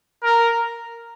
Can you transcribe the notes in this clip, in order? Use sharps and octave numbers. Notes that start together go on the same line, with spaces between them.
A#4